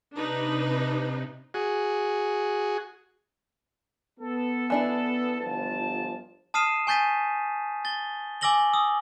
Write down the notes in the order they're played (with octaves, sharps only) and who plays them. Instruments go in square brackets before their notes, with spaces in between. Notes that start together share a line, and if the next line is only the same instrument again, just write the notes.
[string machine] C3 [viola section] D4 D#4 B4
[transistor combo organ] F#4 G#4
[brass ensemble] B3 A4
[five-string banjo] E3 D4 E4
[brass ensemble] G1 F3 A5
[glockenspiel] A5 D#6 F6 C7 D#7 E7
G#5 C#6 G6 A6 B6 D#7
A6 G7
G#5 D6 E6 A#6 F#7 G7
D#6 E6